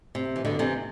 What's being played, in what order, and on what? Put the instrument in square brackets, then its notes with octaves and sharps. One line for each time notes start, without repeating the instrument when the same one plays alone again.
[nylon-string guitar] C3
E3
B2 D3
C3 E3